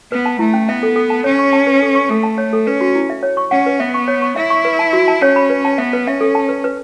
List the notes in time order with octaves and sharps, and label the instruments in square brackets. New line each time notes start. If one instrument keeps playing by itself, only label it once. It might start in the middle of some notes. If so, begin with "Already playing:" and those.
[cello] B3 [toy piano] B4
[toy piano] A5
[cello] A3 [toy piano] E4
[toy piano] C#4
[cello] B3 [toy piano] E5
[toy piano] A4
A4
A5
[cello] C#4 [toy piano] C#5
[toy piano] C#6
A5
B4
A4
C#6
[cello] A3 [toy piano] A4
[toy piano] A5
C#5
A4
[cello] C#4 [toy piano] B4
[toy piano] F#4
E4
E5
C#5
C#6
[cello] C#4 [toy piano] F#5
[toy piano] B4
[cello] B3 [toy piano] E5
[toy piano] C#6
C#5
C#6
[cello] E4 [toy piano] E5
[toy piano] C#6
B4
A5
F#4
A5
[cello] C#4 [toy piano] C#5
[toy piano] B5
B4
A5
[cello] B3 [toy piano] E5
[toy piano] B4
[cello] C#4 [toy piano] E5
[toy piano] A4
A5
B4
B4